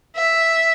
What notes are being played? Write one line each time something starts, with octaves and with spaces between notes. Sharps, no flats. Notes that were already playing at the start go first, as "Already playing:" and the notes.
E5